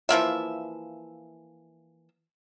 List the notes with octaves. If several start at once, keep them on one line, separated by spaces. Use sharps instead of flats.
E3 F3 A#3 E5